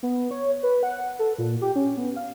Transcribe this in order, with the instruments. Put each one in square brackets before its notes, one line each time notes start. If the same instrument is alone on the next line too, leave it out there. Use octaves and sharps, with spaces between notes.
[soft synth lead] B3
C#5
B4
F#5
A4
A#2
G4
C#4
B3
F5